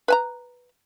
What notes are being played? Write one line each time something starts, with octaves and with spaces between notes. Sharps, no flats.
B4 G#5 A#5